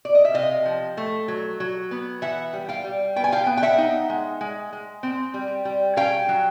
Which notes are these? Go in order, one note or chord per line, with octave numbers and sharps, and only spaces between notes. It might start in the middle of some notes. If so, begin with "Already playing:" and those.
D5
D#5
E5
C3 D#5 F5
F3
A3
F#3
F#3
B3
E3 E5 F#5
G3
F5 G5
G3
B3 G5
G#5
F5 G5
B3
G5
E5 F#5
D#4
G#3
G#3
G#3
C4
G3
G3
C#4 F5 G5
F#3